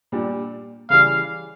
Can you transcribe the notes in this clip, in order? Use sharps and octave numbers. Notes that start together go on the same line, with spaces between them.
A#2 G3 D4
C#3 E3 G3 F5